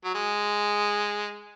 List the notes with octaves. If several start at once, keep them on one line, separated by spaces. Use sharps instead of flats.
F#3
G#3